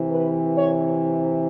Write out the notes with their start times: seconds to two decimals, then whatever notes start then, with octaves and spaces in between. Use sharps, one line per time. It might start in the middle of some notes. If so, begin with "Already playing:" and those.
Already playing: C3 E3
0.11 B4
0.56 C#5